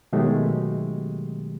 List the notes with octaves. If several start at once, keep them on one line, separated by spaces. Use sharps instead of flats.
B2 D#3 F#3 G#3 A3 G4